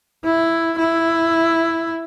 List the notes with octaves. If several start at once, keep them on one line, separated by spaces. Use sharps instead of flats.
E4
E4